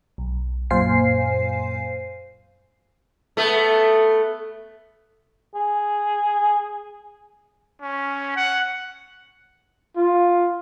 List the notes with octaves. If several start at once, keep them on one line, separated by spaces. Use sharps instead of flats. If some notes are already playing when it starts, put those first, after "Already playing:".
B1
F#2 A#2 C5 F5 G#5 C7
A3 B3
G#4
C#4
F#5
F4